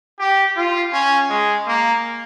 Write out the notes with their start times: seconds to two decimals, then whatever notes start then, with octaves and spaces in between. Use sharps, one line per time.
0.19 G4
0.56 F4
0.93 C#4
1.29 G#3
1.67 A#3